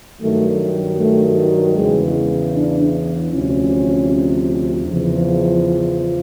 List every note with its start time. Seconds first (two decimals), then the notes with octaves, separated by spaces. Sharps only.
0.21 G2 D#3 F#3 A3
0.98 A3
1.75 E2 C#3 E3 G#3
2.53 D4
3.29 D2 C3 F3 C#4
4.83 E2 C#3 F3